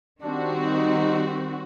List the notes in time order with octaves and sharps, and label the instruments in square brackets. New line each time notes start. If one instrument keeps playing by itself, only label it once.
[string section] D#3 G3 C4 F#4 [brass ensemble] D4
[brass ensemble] D#4